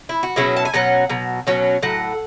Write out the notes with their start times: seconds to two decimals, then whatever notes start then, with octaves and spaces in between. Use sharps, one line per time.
0.09 E4
0.23 F#4
0.36 B2 F#3 C#4 E4 G#4
0.56 A5
0.65 G#5
0.74 B2 F#3 C#4 F#5
1.10 B2 F#3
1.47 B2 F#3 C#4
1.83 A2 F#3 F#5